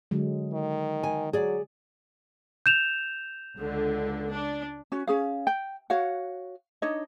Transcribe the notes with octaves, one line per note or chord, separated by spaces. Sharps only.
D3 F#3 G#3
D#3
G#5
F#3 G#4 D5
G6 E7 F7
C#2 D3
D4
C#4 F#4
C#4 G#4 F5
G5
F#4 C#5 F5 F#5
D4 D#4 C#5 D#5